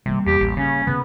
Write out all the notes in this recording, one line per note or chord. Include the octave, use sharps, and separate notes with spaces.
C3 G3 A#3
E2 G4
A1
C#3 C#4
C#3 B3